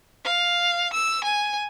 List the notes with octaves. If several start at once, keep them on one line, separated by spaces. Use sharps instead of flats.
F5
E6
G#5